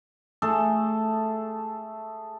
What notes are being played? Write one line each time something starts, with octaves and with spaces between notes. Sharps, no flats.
A3 G#4 A4